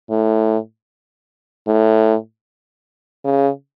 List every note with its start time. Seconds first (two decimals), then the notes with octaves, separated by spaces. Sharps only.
0.10 A2
1.67 A2
3.25 C#3